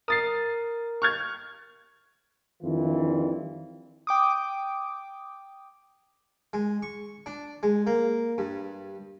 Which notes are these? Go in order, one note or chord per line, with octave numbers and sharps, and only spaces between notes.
A#4 D#6 A6 C7
C#6 F6 G#6
F2 D#3 E3 G3 D4 F4
G5 D6 D#6
G#3
C#6
D4
G#3
A#3
G2